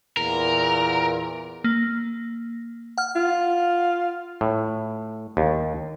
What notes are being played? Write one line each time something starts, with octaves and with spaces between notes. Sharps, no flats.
E2 A#2 A#4
A#3
F#5 F6
F4
A2
D#2